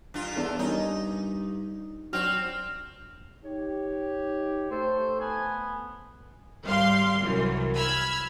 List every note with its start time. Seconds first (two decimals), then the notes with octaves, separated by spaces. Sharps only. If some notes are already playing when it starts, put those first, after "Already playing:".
0.14 G2 F4
0.36 E2 D4 A4
0.59 G2 C#4 D#4 A#4 C#5
2.13 F#3 C4 D4 F#4 F6
3.45 D#4 G4 C#5
4.71 A3 A4 C5
5.20 B3 G#5
6.65 G#1 G3 G4 F5 C6
7.21 C2 F#2 E3 F#3
7.76 B5 E6 F6 G#6